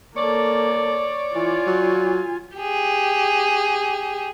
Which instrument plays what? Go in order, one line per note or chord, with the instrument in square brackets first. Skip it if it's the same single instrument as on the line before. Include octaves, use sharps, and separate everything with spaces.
[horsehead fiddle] A#3 A4 [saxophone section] C#5 D5
[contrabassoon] E3 [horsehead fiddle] F4 G#5
[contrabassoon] F#3
[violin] G4 G#4